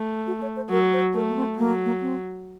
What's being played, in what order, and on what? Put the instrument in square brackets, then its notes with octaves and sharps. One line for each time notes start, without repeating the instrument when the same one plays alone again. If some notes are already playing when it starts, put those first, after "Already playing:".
Already playing: [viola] A3
[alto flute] F#4
C#5
C5
[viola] F#3 [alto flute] A#4
[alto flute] C5
[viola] A3 [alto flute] A#4
[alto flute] A#3
C4
[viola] F#3 [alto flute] A#3
[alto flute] A#3
C4